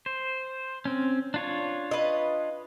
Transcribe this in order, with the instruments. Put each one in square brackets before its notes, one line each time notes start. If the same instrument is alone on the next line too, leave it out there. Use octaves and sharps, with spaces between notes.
[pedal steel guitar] C5
C4 C#4
D4 F4 C#5
[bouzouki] B4 D#5